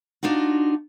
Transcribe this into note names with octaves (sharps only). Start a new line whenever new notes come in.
D4 D#4 F4 F#4